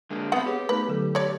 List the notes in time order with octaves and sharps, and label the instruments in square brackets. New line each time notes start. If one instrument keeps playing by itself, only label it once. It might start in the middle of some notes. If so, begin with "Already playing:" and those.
[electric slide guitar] D3 G#3 A#3
[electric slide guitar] A3 C4 F5 [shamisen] B3 F#5
[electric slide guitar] G4 [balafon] G#4 B4 C#5
[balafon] A3 B3 D#4 [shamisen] B4
[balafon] D3 F#3 A4
[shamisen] C#5 D5